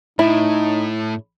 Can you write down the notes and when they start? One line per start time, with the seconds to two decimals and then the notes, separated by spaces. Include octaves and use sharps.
0.19 A2 D#4 E4